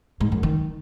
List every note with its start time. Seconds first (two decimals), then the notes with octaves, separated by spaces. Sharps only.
0.21 G#2
0.32 F#2
0.43 D#3